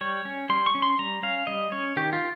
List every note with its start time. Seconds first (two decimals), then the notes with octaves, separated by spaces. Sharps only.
0.01 G3 C#5
0.25 C#4
0.49 G3 C6
0.66 C#6
0.75 C#4
0.82 C6
0.99 G3 A#5
1.23 C#4 F5
1.47 G3 D#5
1.72 C#4 C#5
1.96 D#3 G4
2.13 F4